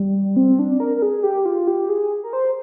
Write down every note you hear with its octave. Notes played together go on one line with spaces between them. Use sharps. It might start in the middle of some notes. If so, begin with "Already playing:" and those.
Already playing: G3
C4
D4
A#4
A#4
G#4
G4
F4
G4
G#4
A#4
C5